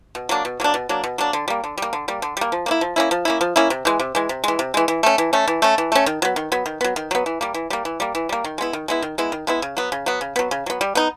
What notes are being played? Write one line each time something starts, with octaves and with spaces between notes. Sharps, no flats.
B2
F#3 A#3 D4
B2
F#3 A#3 D4
B2
F#3 A#3 D4
B2
F#3 A#3 D4
D3
G3 A#3
D3
G3 A#3
D3
G3 A#3
D3
G3 A#3
F3
A#3 C#4 E4
F3
A#3 C#4 E4
F3
A#3 C#4 E4
F3
A#3 C#4 E4
C3
E3 G#3
C3
E3 G#3
C3
E3 G#3
C3
E3 G#3
E3
A3 C#4
E3
A3 C#4
E3
A3 C#4
E3
A3 C#4
D#3
F#3 B3
D#3
F#3 B3
D#3
F#3 B3
D#3
F#3 B3
E3
G3 A#3
E3
G3 A#3
E3
G3 A#3
E3
G3 A#3
D#3
G#3 B3 E4
D#3
G#3 B3 E4
D#3
G#3 B3 E4
D#3
G#3 B3 E4
C#3
F#3 B3
C#3
F#3 B3
C#3
F#3 B3
C#3
F#3 B3
G3
B3 D#4